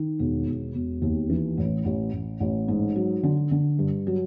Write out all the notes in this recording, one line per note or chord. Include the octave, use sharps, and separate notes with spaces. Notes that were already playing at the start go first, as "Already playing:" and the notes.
Already playing: D#3
E1
E1
E1
D#2
E3
A1
A1
A1
A1
G#2
F#3
D3
D3
G2
F#3